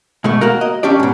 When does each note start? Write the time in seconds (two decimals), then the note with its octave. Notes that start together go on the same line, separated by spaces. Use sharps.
0.24 B2 G#3 A3
0.41 A#3 F#4 A#4
0.61 D#5
0.83 C#4 D4 G4 D5
1.00 G#2 B2